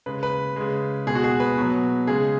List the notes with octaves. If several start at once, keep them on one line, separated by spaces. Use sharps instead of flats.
C#3 G#3 B4
B4
C#3 G#3
B2 G#3 G#4
F#4
G#4
B4
B2 F#3
C#3 G#3 G#4